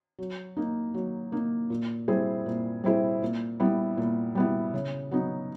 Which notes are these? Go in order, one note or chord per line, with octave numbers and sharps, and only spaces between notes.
F#3
A#3 D#4
F#3
A#3 D#4
A#2
G3 C4 E4 G#4
A#2
G3 C4 E4 G#4
A#2
G3 B3 E4
A#2
G3 B3 E4
C#3
F#3 B3 D#4